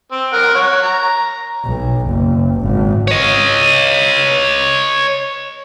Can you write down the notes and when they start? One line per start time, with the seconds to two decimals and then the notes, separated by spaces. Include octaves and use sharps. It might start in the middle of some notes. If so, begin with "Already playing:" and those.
0.12 C4
0.33 A#4 F#5
0.55 C#5 F#5
0.83 A#5
1.65 B1
2.08 F#1
2.62 G#1
3.08 C#5 D#5